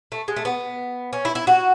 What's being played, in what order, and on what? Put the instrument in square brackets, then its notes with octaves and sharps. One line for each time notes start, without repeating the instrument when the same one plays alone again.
[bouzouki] A3
G#3
A3
B3
C#4
E4
E4
F#4